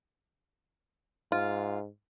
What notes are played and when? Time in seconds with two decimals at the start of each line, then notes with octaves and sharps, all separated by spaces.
1.32 G#2 F4